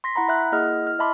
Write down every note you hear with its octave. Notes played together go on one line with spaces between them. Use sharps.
C6 A#6 B6
E4 F#5 A#5 B5
E5 F#6
A#3 E4 G#4 D#5 F#5 F6
E4 F6
D#5 E5 A5 B5 C6 D6